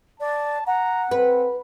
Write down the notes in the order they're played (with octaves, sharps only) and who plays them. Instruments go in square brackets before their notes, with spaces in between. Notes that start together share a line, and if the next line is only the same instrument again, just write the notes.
[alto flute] D5 [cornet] A5
[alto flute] F#5 [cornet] A#5
[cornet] C4 [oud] B4